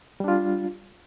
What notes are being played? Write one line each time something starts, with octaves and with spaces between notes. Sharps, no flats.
G3 D4 F4